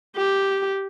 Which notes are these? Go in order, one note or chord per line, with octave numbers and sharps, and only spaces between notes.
G4